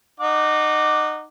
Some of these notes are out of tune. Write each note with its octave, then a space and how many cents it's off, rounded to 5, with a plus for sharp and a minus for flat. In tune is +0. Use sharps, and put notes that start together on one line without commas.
D#4 -20 F#5 +0 D6 +0